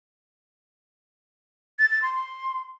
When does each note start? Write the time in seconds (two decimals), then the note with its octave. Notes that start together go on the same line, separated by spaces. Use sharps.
1.79 A6
1.91 A6
2.02 C6
2.14 C6